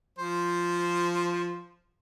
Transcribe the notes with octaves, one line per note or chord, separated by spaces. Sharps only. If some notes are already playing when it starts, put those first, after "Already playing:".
F3 C5